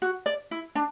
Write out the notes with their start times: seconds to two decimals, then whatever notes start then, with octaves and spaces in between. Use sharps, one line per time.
0.02 F#4
0.26 D5
0.51 E4
0.75 D4